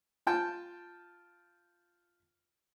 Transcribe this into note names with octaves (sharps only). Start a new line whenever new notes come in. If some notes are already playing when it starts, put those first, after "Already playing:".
F4 G5 A5